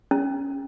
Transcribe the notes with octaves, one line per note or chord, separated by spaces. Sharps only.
C#4